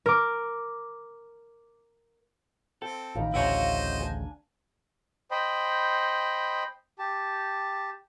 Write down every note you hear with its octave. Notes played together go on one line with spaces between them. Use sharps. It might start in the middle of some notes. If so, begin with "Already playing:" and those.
A#4 D6
C4 A4 G5
A1 D#3 F5 A#5 B5
A1 D2 C#3 E4 F#4 C5 C#5 D#5
D4 G#5
C5 D#5 G5 B5
G4 A5